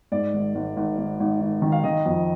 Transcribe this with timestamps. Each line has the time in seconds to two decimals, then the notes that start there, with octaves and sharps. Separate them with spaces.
0.12 G#2 D5
0.34 G#1
0.55 G#1
0.76 G#1
0.98 G#1
1.20 G#1
1.41 G#1
1.62 D#3
1.72 F5
1.84 D#3 D#5
2.06 F2